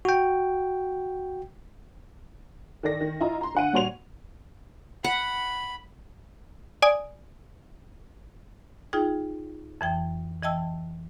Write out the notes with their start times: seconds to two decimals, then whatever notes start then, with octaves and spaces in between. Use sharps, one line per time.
0.05 F#4 G5
2.83 D#3 A4 D5 A#6
3.01 D#3
3.21 E4 F4 D#5 A#5
3.41 A#5 C6
3.55 D3 F#5 D#7
3.73 A#2 G3 F#4 C#5 C6 F7
5.04 F#5 B5
6.82 D5 G#5 D#6
8.93 D#4 F4 G#4 G5
9.81 F2 E3 G5
10.43 E3 D#5 G5 A5 E6